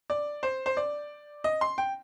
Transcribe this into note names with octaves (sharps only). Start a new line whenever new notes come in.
D5
C5
C5
D5
D#5
C6
G5